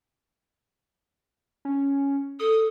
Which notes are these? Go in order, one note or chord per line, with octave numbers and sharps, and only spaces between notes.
C#4
A4 D#6